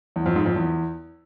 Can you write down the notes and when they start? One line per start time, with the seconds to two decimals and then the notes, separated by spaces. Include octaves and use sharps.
0.16 E2
0.26 F2
0.36 G#2
0.46 F2
0.56 E2